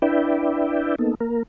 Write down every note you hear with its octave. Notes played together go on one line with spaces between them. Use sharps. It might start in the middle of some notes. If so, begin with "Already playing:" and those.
D4 E4 B4 D5 E5 G5
A#3 B3 D#4 A4
A#3 A#4